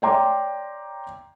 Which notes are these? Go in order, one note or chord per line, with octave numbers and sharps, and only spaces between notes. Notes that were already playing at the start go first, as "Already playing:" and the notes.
C#5 D5 G5 A#5 C6 D6